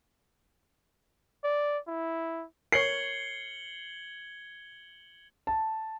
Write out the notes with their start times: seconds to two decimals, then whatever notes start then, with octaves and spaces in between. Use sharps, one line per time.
1.44 D5
1.87 E4
2.72 A#4 C#5 G#6 C7 C#7 F#7 G7
5.47 A5